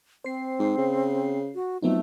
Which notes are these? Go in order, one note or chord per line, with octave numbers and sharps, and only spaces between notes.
C4 C5 C7
G#2
C#3
F#4
F2 F#3 A3 B3 D#4